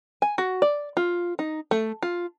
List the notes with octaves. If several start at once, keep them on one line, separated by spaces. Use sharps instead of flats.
G#5
F#4
D5
F4
D#4
A3
F4